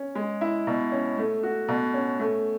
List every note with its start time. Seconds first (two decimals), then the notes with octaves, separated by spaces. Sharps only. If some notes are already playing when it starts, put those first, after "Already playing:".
Already playing: C#4
0.15 G#3
0.41 E4
0.67 B2
0.92 C#4
1.18 A3
1.43 F#4
1.69 B2
1.94 C#4
2.20 A3